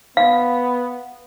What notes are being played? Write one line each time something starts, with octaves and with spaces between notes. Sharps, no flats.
B3 F5